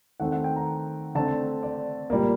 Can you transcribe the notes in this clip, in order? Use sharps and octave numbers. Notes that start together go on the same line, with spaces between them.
D#3 A3 C4 F#5
F#5
G5
A#5
D3 A3 C4 A5
D5
A#2 G3 A#3